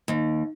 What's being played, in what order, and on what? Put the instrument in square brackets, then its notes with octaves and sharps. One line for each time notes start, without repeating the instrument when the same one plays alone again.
[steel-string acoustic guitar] D#2